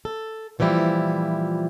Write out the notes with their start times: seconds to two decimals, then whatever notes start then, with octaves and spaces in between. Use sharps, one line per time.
0.05 A4
0.59 A#2 E3 F3 G3 E4